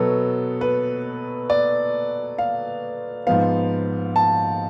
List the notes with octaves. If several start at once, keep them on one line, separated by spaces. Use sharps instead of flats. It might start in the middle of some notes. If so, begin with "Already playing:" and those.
Already playing: B2 F#3 B3 A4
B4
D5
F5
G#2 F3 B3 F5
A5